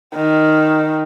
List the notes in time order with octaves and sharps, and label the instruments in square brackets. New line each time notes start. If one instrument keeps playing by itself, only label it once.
[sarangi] D#3